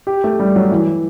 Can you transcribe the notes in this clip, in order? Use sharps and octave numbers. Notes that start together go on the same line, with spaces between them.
G4
A3
G3
F#3
E3